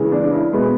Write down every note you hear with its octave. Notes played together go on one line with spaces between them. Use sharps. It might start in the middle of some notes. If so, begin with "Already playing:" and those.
Already playing: C#3 E3 G#3
D4
E4
B2 G#3 B4